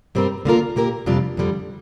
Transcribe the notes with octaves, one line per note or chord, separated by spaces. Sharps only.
G2 G3 C4 A#4
D3 A#3 F4 A#4
A#2 A#3 G4 A#4
F2 C3 G3 D4 F4
F2 D3 G3